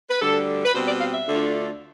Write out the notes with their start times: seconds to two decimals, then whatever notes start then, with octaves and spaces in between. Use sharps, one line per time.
0.10 B4
0.22 D2 D3 G3 A4
0.65 B4
0.74 B2 G3 C4 C5
0.88 D5
1.01 F5
1.14 E5
1.28 D2 D3 A3 D4 F4